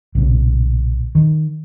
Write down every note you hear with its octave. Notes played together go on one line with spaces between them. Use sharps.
B1 A#2 C#3
D#3